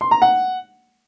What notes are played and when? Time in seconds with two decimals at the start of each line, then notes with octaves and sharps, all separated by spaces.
0.01 C6
0.11 A#5
0.22 F#5